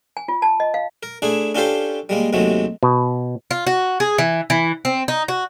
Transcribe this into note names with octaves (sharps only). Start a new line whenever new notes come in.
G#5
F4
A5
D#5
F5
A#4
A3 D4 E4 G#4
C#4 D4 F4 G4 A4 C5
G3 G#3 A#3
D#2 G#2 C3 F#3 G#3 A3
B2
F4
F#4
G#4
E3
E3
C4
D#4
F#4